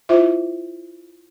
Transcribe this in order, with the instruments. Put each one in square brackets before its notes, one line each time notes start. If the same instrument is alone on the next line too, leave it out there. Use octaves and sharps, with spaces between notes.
[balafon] E4 F4 C5 E5